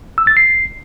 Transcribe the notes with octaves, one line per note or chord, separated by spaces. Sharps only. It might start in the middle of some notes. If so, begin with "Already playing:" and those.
E6
A6
C7